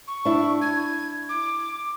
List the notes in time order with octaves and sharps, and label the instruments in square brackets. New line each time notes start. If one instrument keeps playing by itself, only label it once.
[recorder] C#6
[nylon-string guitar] D4 E4
[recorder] G#6
D6